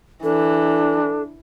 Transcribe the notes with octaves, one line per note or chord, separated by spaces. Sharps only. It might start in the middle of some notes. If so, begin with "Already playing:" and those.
E3 D4 A4